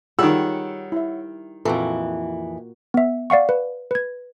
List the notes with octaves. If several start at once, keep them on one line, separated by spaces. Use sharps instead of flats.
D#3 G3 F4 G#4 C#5 D5 F#5 E6
E4 E5
F2 A#2 E3 F#4 A4 G5
B3 E5
D5 F5 F#5 C#6
B4
B4 G#6